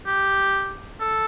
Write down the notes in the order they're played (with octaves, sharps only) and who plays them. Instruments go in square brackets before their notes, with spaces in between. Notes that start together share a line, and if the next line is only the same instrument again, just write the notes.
[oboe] G4
A4